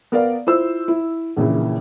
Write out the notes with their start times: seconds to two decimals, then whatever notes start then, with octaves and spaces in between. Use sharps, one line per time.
0.12 B3 A#4 D5 F5
0.47 E4 F4 C5 E6
0.88 E4
1.37 A#1 A#2 C#3 E3